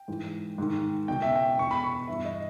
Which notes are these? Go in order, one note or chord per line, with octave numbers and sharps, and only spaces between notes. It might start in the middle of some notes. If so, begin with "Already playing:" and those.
Already playing: G5
G#2 E3
G#2 D#3
C#2 B2 G5
E5
G5
E2 B2 C#6
B5
C#6
G2 E3 E5
D#5